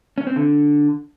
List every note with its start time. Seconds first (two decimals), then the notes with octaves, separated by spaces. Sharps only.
0.18 C#4
0.27 C4
0.36 D3